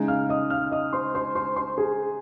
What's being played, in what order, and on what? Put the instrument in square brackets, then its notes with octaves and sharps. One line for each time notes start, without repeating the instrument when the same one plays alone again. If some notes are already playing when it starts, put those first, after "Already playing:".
Already playing: [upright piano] C#3 G#3 D#4
[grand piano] F5 F6
D#5 D#6
F5 F6
D#5 D#6
C5 C6
C5 C6
C5 C6
C5 C6
G#4 G#5